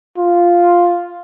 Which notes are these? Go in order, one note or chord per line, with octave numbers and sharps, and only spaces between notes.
F4